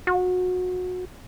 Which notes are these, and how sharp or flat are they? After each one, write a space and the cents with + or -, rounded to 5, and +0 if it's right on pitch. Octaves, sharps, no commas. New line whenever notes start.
F#4 -25